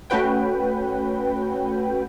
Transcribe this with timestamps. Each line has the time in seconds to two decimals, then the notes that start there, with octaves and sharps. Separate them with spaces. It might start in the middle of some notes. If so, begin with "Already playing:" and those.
0.10 A3 C#4 F#4 B4 G5